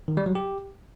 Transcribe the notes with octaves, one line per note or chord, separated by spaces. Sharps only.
D#3
G3
F#3
G4